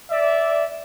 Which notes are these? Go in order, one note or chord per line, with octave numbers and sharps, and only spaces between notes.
D5 E5